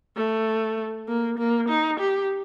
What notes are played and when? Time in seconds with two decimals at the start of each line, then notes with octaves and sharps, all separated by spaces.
0.17 A3
1.08 A#3
1.39 A#3
1.69 D#4
2.00 G4